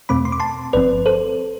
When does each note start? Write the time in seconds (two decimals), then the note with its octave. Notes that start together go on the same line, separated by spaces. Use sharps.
0.09 E2 B2 A3 C4 B5 D6
0.25 C6
0.32 D6
0.40 A5 C6
0.73 G1 G2 F3 C4 B4 D5
1.06 A4 C5